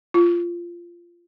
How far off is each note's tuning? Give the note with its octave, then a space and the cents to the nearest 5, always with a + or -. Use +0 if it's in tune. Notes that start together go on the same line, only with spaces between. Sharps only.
F4 -15